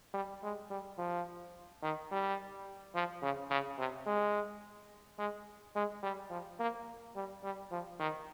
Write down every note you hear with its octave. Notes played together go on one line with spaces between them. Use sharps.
G3
G#3
G3
F3
D#3
G3
F3
C#3
C#3
C3
G#3
G#3
G#3
G3
F3
A#3
G3
G3
F3
D#3